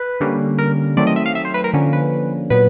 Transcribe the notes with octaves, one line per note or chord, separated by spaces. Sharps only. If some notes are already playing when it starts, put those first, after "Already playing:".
Already playing: B4
D3 G3 A#3 C#4
A#4
D#3 F#3 A3 C4 D5
D#5
E5
F5
E5
C5
B4
A#4
D3 F3 A#3 C#4
B4
A#2 F#3 B3 B4